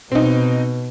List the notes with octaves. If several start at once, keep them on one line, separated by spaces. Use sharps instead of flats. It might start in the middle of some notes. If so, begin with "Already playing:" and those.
B2 C4 D#4